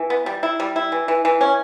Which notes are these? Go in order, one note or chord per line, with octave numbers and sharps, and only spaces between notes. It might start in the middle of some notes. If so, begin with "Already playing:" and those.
Already playing: E3
B3
G3
E4
G3
E4
E3
E3
E3
C#4